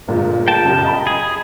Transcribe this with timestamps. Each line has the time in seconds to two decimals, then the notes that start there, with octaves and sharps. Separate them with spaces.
0.08 G1 A#2 G#3
0.48 G5 A5
0.65 F#2 C#3 G4
0.84 D#5 A#5 B5
1.07 G#4